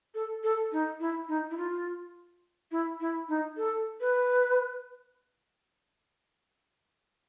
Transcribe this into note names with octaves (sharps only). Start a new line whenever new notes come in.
A4
A4
D#4
E4
D#4
E4
F4
E4
E4
D#4
A4
B4